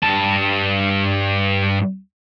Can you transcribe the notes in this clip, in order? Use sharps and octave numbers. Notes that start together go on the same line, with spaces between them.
G2 A5